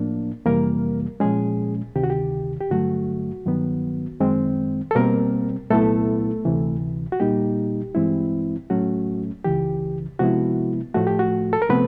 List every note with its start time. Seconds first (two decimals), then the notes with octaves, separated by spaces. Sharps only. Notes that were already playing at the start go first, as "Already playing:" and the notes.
Already playing: A2 F3 A#3 D4
0.46 F2 C3 E3 G3 A#3 A#4
1.20 A#2 F3 G#3 C#4 G#4
1.96 D2 C3 D#3 G4
2.04 F#4
2.10 G4
2.60 G4
2.70 G2 D3 F#3 A3 F#4
3.45 G2 D#3 F#3 B3
4.20 F#2 D#3 G#3 C4
4.91 A4
4.95 B2 G3 A#3 C4 A#4
5.70 C2 A#2 F#3 A3 B3 E4 A4
6.45 D2 C3 E3
7.12 F#4
7.20 A#2 G3 A#3 D#4 G4
7.95 G2 E3 G#3 C4 E4
8.70 A2 F#3 A3 C#4 F#4
9.45 C#2 C#3 E3 G4
10.19 C3 F3 G#3 B3 E4 F#4
10.94 A2 F3 A3 F#4
11.07 G4
11.19 F#4
11.53 A4
11.62 A#4
11.70 C3 F3 A3 B3 C4 B4